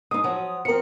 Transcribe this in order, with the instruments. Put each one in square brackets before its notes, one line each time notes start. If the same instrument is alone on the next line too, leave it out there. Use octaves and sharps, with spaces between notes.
[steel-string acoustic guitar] G#3 D#4 [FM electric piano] D#6
[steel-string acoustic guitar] F3 F#3
[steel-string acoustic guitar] F3 C4 [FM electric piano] A#4 C#7